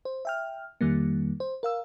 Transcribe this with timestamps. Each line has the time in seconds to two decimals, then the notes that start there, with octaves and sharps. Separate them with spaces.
0.05 C5
0.25 E5 G5 F6
0.81 F2 D#3 G3 A#3
1.40 C5
1.63 A#4 F5 E6